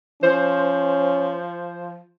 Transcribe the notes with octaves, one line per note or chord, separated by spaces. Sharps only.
F3 C#4 C5